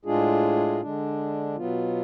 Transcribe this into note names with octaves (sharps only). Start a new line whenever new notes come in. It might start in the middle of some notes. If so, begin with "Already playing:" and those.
A2 G#3 D4 F4 G#4
D3 G#3 D4
B2 F#3 B3 F4